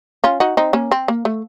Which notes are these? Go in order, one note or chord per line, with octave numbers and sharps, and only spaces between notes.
C#4 F4
D#4 F#4
C4 D#4
A#3 C#4
C4
A#3
A3